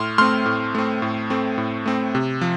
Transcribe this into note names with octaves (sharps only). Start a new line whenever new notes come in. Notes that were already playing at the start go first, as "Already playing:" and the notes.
Already playing: A2 C6 F6
A3 C4 C6 F6
A2
A3 C4
A2
A3 C4
A2
A3 C4
C3
F3